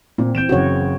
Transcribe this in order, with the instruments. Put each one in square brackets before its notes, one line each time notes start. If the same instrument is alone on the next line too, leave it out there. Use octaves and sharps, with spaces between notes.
[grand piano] A#2 [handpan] C4
[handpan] E3 C4 [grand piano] G6 D7 E7
[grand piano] F#1 C#3 [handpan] F#4 C#5